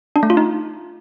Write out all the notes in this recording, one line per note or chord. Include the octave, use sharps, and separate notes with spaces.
D4
A3
F4
D#4